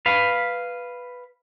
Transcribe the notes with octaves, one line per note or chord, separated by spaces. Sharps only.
B4 F5